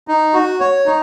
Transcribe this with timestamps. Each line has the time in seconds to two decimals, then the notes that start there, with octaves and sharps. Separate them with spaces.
0.08 D#4
0.33 F#4
0.60 C#5
0.86 D#4